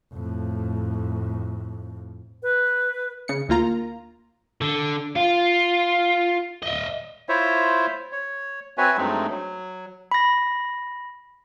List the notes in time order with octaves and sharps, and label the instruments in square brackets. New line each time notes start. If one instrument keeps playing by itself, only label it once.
[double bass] F2 A2
[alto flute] B4
[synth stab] C#3 C#7
D2 A#3 F4 A#5
[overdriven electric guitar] D3
F4
D#5 E5
[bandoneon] E4 F4 C5 C#5 E5
C#5
C4 F#4 B4 C#5 E5 G#5
G2 F#3 G#3 A3 C4 D#4
F#3
[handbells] B5 A#6